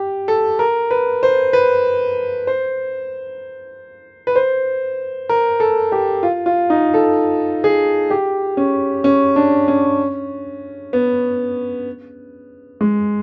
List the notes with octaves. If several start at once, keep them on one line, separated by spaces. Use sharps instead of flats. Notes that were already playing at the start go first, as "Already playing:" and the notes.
Already playing: G4
A4
A#4
B4
C5
B4
C5
B4
C5
A#4
A4
G4
F4
F4
D#4
A4
G#4
G4
C#4
C#4
D4
C#4
B3
G#3